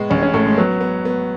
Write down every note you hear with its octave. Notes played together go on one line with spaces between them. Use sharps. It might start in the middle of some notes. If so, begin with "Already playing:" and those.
Already playing: A2 G#3 B3
A1 C#4
C#4
A2 A3
G#3
F#3 B3
B3
B3